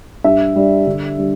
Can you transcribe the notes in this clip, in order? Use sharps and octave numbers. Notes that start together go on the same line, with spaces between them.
G2 E5
G3 D4
D3
G3 D4